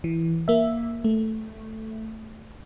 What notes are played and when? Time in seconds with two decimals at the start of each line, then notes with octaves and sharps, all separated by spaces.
0.04 E3
0.48 A#3 E5
1.04 A3